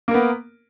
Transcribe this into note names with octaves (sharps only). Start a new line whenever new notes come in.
A#3 B3 A#4